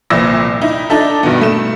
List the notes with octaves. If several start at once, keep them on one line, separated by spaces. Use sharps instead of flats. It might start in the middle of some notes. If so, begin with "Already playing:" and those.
G1 C2 A#2 F3 E6 A#6
D#4 E4
D4 D#4 A4 E5
G2 B2 D#3 B3
A3 E7